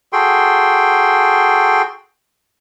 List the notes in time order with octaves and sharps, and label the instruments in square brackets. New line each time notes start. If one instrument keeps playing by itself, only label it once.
[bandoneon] F#4 G#4 A4 G5 C6